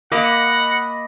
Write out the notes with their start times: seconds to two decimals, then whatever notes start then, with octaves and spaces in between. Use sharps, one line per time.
0.12 A#3 D#5 F#5 B5 D6